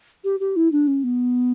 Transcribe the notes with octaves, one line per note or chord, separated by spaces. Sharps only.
G4
G4
E4
D4
C#4
B3